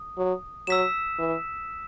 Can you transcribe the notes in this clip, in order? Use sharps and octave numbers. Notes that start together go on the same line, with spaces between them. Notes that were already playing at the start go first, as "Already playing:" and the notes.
Already playing: D#6
F#3
F#3 E6 B6 E7
E3